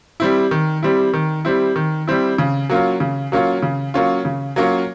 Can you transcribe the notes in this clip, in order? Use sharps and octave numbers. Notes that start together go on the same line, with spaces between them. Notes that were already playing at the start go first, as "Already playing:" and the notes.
G3 C4 E4
D#3
G3 C4 E4
D#3
G3 C4 E4
D#3
G3 C4 E4
C#3
F#3 A#3 C#4 F4
C#3
F#3 A#3 C#4 F4
C#3
F#3 A#3 C#4 F4
C#3
F#3 A#3 C#4 F4